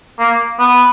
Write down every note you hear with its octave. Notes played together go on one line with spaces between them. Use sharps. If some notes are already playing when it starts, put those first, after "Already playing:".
A#3
B3